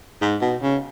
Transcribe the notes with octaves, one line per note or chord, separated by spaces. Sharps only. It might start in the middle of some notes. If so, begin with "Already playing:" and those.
G#2
B2
C#3